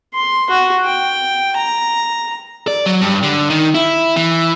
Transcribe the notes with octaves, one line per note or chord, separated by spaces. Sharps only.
C6
F#4
G5
A#5
D5
F#3
G2
D3
D#3
E4
E3